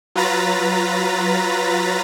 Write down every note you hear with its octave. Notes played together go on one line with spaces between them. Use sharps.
F#3 F4 B4 A#5 A6 B6